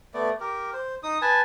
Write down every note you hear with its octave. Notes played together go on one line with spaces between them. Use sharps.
A3 B3 D5
G4 A#4
C5
D#4 D#6
B4 G#5 A5